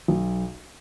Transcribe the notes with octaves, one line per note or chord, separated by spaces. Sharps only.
B1